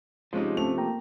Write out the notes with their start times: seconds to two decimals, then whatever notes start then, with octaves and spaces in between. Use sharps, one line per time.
0.33 C3 F3 G#3 C#4 D#4
0.57 A3 C4 C#4 F7
0.78 A#3 G5 A#5